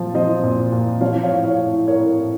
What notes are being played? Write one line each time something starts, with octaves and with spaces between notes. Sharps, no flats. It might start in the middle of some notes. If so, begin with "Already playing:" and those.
Already playing: A#2 F3
F3 C5 D#5
A#2
A#2
F3 C#5 F5
C#5 F5
A2
C#5 F5
A2
A2 A#4 C#5
A2